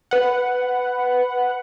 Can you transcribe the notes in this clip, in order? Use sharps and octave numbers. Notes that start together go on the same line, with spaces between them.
B4 F#5